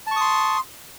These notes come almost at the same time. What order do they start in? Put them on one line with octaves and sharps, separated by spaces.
A5 C#6 D#6 C6